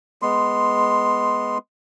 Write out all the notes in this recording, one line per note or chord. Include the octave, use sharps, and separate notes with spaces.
G#3 B3 C6